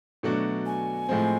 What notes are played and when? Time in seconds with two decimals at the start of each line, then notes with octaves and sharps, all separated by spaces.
0.23 B2 F#3 A3 D4 F#4
0.66 G#5
1.09 A2 F3 G#3 C4